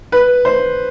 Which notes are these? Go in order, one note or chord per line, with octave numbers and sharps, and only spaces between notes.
B4
C5